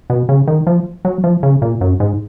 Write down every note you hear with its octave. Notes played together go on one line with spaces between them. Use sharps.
B2
C#3
D#3
F3
F#3
F3
C#3
A#2
F#2
G#2